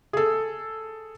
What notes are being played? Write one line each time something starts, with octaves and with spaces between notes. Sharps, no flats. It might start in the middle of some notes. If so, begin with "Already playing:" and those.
G#4 A4